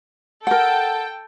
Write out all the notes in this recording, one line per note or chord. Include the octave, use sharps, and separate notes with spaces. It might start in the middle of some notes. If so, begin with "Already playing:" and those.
A4 A#4 F#5 G5